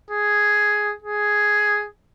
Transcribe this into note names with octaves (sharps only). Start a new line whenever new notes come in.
G#4
G#4